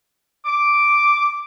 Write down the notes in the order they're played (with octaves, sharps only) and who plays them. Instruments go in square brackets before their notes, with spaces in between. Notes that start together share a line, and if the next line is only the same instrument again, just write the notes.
[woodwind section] D6